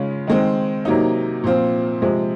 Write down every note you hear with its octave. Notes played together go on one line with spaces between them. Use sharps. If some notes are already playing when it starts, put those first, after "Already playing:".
Already playing: C#3 G#3 C#4 F4
D#3 G#3 C4
C3 F#3 A#3 D#4
A#2 F3 C4 F4
C3 F3 G#3